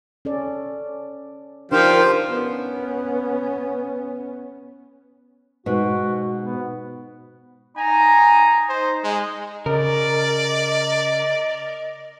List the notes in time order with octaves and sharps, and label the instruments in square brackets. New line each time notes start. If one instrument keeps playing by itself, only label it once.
[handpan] C#4 A4 D5
[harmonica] F3 G4 F5 [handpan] D4 D#4 F4 [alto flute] A#4 [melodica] C5
[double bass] B3 C#4
[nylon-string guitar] G#2 B2 [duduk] F#4
[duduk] B3
[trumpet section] D#4 A#5 [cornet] G#5
[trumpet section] D#4 [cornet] C5
[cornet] G#3
[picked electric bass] C#3 [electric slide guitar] A#4 [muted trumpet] D5 [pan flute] D#5